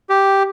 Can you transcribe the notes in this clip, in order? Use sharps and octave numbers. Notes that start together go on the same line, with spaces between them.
G4